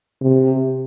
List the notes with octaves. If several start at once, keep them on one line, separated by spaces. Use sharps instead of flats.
C3